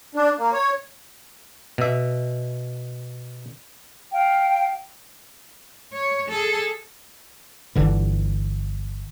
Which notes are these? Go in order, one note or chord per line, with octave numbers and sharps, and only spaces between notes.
D4
A#3
C#5
B2 E5
F5 G5
C#5
G#4 A4
G1 D3 E3